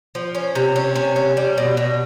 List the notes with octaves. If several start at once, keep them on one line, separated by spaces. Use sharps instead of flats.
F3
C#4
C3
C#4
C3
C#4
G3
B2
B2